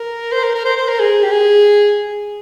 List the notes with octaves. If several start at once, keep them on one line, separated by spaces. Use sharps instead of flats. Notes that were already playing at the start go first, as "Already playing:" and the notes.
Already playing: A#4
C5
A#4
A#4
C5
C5
A#4
G#4
G4
G#4